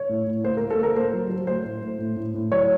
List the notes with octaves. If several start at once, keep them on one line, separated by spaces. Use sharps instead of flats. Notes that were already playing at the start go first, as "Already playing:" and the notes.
Already playing: C#5
A2
A2
A#3 C5
A#3 A#4
A4
A#3
A#4
A#3 C5
F#3
F#3
A3 C5
A2
A3
A2
A2
A2
F#3 C#5